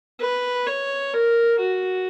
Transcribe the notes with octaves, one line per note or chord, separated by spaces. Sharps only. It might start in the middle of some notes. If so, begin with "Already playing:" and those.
B4
C#5
A#4
F#4